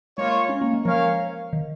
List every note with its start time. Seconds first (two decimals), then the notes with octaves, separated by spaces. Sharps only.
0.18 G#3 A#3 F4 C#5
0.49 C#4
0.61 A#3
0.73 G#3
0.85 F3 C#4 A#4 C#5 F5
1.53 D#3